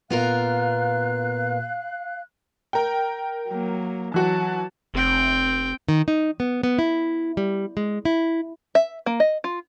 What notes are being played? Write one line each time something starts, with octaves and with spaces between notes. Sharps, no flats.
A#2 B3 F4 A#4 F5 F#6
A#4 G5
F#3 A#3
E3 F#3 F#4 A5
F1 C4 G5
D#3
D#4
B3
B3
E4
G3
G#3
E4
E5
A#3
D#5
F4